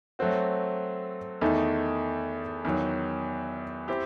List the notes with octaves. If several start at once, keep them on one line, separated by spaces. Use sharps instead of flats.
F#3 A3 C4 F#4
E2 D#3 A3 D#4
E2 D#3 F#3
C4 E4 G4